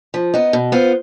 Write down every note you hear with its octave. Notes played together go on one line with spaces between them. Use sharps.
F3
B3 D#4
B2
B3 F4 C5